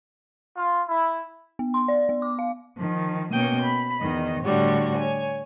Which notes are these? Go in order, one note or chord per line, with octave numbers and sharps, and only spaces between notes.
F4
E4
B3
C6
D5
B3
D6
F5
D#3 F3
B2 A#3 C#4 G5 D#6
B5
E2 D#3 D#5
A2 D3 G3 F#4 C#5
C#5 G#5